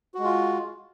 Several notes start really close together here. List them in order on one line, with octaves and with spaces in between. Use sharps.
F#4 G#3 F4